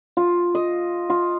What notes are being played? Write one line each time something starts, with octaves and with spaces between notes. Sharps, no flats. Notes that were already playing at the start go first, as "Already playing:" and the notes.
F4
D#5
F4